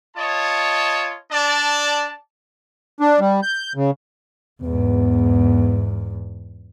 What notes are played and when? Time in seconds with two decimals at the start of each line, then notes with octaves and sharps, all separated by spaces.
0.16 F4 C#5 D#5 A5
1.30 D4 D5 A5
3.00 D4
3.20 G3
3.43 G6
3.76 C#3
4.62 E2 G#2 B3